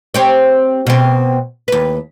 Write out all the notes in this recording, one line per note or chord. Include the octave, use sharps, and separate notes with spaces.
C4 G4 C#5
B2 C4
D#2 B4